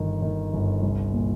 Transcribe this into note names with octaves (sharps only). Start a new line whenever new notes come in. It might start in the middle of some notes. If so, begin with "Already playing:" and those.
Already playing: G1 D#3
D#3
G1
C2
A#2